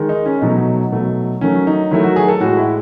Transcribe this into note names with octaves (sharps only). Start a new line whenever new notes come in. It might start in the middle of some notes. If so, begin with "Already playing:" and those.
Already playing: D#3 G#3
D#4
C#4
B2 F#3 A3 D#4
B2 F#3 A3
D#3 F#3 A3 C#4
D#4
D#3 F#3 A3 E4
F#4
G#4
A4
A2 G#3 F#4
E4